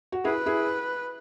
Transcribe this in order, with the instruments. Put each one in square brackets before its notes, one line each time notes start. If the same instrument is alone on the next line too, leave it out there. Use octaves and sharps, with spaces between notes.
[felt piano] F#4
[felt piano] E4 G#4 [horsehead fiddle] B4
[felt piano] E4 G#4